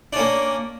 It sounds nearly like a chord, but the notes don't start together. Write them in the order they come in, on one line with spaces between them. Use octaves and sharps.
D4 C#4 A#3